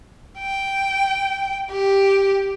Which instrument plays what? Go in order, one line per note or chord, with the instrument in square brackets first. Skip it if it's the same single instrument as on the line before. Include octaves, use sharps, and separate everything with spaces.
[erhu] G5
G4